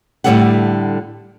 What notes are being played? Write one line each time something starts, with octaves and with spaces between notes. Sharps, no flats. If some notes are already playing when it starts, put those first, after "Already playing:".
A2 D3 G3 G4 A4 F#5